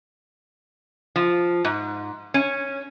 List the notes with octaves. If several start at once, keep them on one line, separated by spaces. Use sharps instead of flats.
F3
G#2
C#4